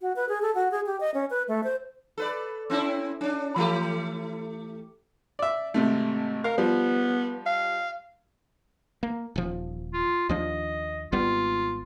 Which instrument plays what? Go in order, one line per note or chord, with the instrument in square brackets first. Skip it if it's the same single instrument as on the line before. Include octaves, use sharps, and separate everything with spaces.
[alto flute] F#4
B4
G#4
A4
F#4
G#4
G4
D#5
C#4
B4
A3
C5
[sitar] A4 B4 D5
C4 C#4 E4
C#4 D4
E3 A3 G4
[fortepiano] D5 E5
G#1 C3 A3
[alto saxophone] A#4 [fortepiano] F5
[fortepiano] F3 G3 [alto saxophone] B3
[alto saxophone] F5
[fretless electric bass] A#3
D#1 F3
[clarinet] F4
[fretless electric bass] D#2 F3 D4 [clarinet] D#5
[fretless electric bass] G#1 G3 B3 [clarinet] F4